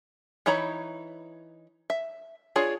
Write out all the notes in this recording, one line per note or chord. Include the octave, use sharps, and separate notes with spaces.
E3 D#4 C#5 A#5 B5
E5
D4 F4 G#4 C#5